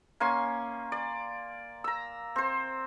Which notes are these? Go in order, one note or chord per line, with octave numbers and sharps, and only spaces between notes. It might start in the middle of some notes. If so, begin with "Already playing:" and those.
A#3 C#4 G#5 C6
D5
A#5 E6
C4 C5